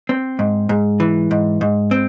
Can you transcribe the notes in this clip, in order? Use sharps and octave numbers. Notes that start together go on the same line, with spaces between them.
C4
G#2
G#2
E3
G#2
G#2
C4